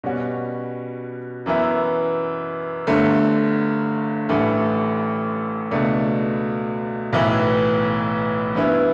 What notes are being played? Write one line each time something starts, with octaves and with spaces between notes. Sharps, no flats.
B2 G3 C#4 F#4
F#2 E3 B3 E4
G1 G2 D3 A3
A1 G2 E3 A3
C#2 B2 A3 D4
B1 A2 E3 B3 E4
G2 E3 B3 E4